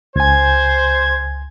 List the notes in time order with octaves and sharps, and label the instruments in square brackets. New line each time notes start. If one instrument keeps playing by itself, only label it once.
[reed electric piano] C#2 G#5 [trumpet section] C5 [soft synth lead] G#6